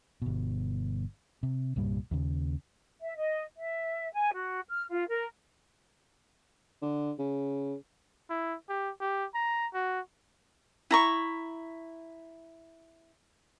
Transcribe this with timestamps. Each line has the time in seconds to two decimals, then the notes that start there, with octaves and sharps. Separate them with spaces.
0.22 G1 B2
1.43 C3
1.76 C2 G2 A#2 G3
2.11 D#2 C#3
3.01 E5
3.17 D#5
3.56 E5
4.13 G#5
4.33 F#4
4.68 F6
4.90 F4
5.08 A#4
6.82 D3
7.19 C#3
8.30 E4
8.69 G4
9.00 G4
9.34 A#5
9.74 F#4
10.91 E4 A#5 C#6